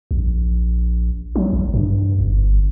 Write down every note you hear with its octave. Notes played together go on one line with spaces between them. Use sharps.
A#1
F#3
A1
G2
G1